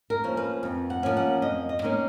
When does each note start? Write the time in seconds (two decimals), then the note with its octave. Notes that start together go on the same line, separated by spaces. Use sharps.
0.10 A#4
0.24 F3 A#3 C#4
0.37 B4
0.63 F2
0.90 F#5
1.03 F3 A#3 C#4
1.17 F#5
1.42 F2 D#5
1.69 D#5
1.82 D#3 A#3 C#4